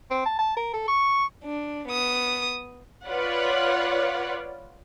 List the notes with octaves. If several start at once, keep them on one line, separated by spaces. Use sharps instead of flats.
C4
A5
A5
A#4
A4
C#6
D4
B3 D#6
F4 B4 C#5 D5 F#5